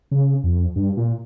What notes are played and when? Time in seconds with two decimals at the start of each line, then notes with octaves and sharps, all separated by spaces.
0.11 C#3
0.44 F2
0.76 G2
0.97 A#2